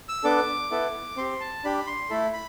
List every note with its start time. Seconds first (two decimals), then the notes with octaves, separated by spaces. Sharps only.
0.09 E6
0.24 B3 D4 A4 D6
0.71 B3 E4 A4
1.17 C4 G4 C6
1.40 A5
1.64 D4 G4 B5
1.87 C6
2.10 A3 E4 A4 B5
2.33 B5